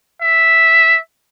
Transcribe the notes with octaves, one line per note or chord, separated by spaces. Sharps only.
E5